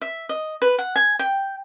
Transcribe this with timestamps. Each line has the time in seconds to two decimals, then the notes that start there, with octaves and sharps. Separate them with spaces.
0.01 E5
0.29 D#5
0.62 B4
0.78 F#5
0.96 G#5
1.19 G5